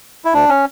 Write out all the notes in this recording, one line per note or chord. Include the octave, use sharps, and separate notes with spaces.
E4
D2 D4
C#4